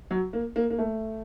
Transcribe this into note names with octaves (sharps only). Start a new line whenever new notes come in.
F#3
A#3
A#3
A#3
A3